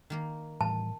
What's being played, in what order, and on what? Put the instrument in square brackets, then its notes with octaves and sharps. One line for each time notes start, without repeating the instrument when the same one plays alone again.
[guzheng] D#3 A#3 A#4
[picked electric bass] A2 E3 G3 [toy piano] A5